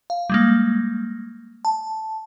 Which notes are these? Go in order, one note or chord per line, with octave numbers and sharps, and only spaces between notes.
F5
G3 G#3 A#3
A5